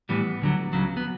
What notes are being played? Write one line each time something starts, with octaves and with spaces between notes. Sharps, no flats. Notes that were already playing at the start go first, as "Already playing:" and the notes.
A2 E3 G3 B3
D2 D3 F#3
C#2 C#3 F#3
B3